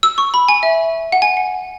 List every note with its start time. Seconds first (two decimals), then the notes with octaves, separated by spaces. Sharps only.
0.03 E6
0.18 C#6
0.34 B5
0.49 G#5
0.63 E5
1.12 F#5
1.22 G#5
1.37 F#5